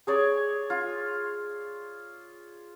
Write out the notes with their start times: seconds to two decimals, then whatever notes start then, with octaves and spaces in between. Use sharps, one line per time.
0.07 G#4 C#5 D5
0.70 F4